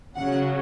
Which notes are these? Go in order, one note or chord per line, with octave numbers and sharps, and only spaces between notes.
C#3 F#3 C#4 F#5